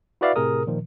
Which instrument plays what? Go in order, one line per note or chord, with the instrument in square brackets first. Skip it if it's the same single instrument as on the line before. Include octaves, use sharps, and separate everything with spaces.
[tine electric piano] E4 F#4 B4 D5 E5 F5
A2 C3 G#4 A#4 D#6
A#2 D#3 F3